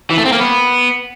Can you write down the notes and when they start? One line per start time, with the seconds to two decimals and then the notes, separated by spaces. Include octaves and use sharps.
0.10 E3
0.18 A3
0.25 C4
0.32 A#3
0.40 B3